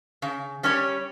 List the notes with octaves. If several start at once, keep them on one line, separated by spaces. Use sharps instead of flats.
C#3
G3 C#4 G4 C#5